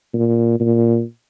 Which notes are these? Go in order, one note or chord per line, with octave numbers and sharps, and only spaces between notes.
A#2
A#2